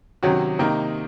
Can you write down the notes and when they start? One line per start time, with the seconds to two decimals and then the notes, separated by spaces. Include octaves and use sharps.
0.23 C3 D#3 F#3 C#4 F#4
0.59 C3 D#3 A#3 D#4